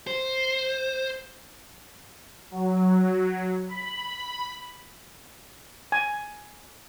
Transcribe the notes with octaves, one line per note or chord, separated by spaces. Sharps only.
C5
F#3
B5
G#5